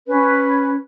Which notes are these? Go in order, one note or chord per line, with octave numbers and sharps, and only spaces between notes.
C#4 B4